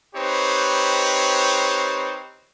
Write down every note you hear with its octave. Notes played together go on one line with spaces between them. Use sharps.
C4 D#4 G4 B4 C#5